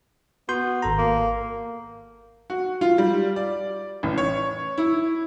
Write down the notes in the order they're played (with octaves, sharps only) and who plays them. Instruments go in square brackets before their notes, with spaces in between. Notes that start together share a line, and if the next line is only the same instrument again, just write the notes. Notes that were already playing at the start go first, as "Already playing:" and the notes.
[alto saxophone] B3 [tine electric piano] F#4 C6 G6
[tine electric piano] G#1 A4 A#5
[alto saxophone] A#3
[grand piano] F#4
F4
G3
D5
A1
C#5
E4